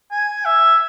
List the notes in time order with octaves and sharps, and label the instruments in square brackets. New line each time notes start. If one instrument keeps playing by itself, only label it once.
[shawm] G#5
E5